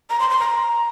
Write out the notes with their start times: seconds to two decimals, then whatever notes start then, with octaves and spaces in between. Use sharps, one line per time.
0.10 A#5
0.20 C6
0.30 C6
0.39 A#5